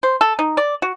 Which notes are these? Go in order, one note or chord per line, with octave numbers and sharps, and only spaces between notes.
C5
A4
D#4
D5
F#4